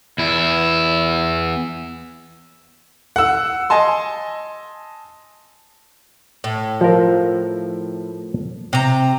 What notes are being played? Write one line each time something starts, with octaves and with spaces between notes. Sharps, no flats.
E2 E4
F#5 E6
D#5 G#5 A5 C6
A2
F3 A#4
C3 A#5